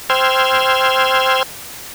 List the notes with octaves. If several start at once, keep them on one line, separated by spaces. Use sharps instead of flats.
C5 G5 C6 E6 F6 G#6